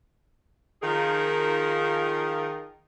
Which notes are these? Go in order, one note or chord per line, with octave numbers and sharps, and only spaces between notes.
D#3 F3 D#4 F4 G#4 A#4